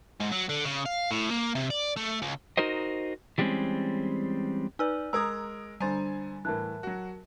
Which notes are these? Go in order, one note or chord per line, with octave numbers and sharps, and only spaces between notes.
G#2
F#3
D3
C#3
F5
A2
A#3
C3
D5
A3
C#2
D#4 F#4 A#4 C5 D#5
E3 G3 G#3 A#3 C4 C#4
D#4 B4 D5 G#5 E6 F6
G#3 A#4 A#5 D#6 E6 G#6
D3 G3 C5 G#5 A#5 A6
A2 E3 A#4 A5 F#6
F#3 F#4